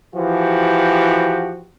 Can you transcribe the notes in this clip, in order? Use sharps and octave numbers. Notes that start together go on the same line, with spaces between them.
E3 F3 F#4 G4